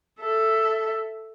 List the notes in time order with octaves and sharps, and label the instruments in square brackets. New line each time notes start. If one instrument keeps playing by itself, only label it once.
[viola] A4 E5